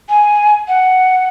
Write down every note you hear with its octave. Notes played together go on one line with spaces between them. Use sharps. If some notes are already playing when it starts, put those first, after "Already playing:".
G#5
F#5